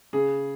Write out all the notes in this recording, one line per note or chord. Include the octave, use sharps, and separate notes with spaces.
C#3 G#4